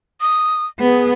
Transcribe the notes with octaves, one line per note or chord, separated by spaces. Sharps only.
D#6
B3 G#4